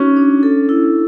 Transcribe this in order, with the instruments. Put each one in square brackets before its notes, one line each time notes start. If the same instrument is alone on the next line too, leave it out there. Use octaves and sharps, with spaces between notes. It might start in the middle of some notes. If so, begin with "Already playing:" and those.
Already playing: [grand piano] C#4 [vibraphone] D#4 F#4
[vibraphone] D4
A4
E4